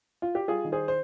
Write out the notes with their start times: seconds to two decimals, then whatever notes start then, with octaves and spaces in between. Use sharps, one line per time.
0.22 F4
0.35 G4
0.48 G3 F4 G#4
0.65 D#3
0.72 G#4 C5
0.88 C5